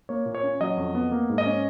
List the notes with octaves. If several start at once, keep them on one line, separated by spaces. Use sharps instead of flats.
A#3 C#5
A#2
C#5
C#4
F#3 D#5
F2
B3
A#3
G#2
D#5
C#4